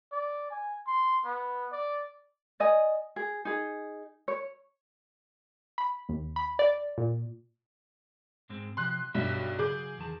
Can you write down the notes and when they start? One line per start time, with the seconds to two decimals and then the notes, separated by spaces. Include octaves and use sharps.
0.12 D5
0.51 G#5
0.87 C6
1.25 B3
1.72 D5
2.60 D5 D#5 G#5
3.16 G#4
3.45 D#4 G#4
4.28 C#5
5.78 B5
6.09 D#2
6.36 B5
6.59 D5
6.98 A#2
8.49 G#2 G#3 C4
8.77 C3 F3 C6 F#6
9.14 B1 G2 E5
9.59 C#3 F#3 G#4 D6 G6
9.98 E2 D#3 A5